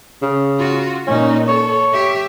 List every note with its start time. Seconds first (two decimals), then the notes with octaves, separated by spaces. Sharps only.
0.22 C#3
0.58 F4 F#4
1.07 A#2 C#4 D#4
1.48 A4 C#5
1.93 G4 E5